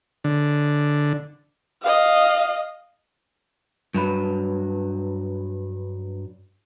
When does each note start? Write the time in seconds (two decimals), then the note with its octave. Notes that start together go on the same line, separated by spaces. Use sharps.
0.24 D3
1.83 D#5 F5
3.94 G2 F#3 B4